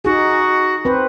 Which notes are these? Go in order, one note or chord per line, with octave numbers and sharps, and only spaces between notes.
D#4 F#4 G#4
C4 B4 C5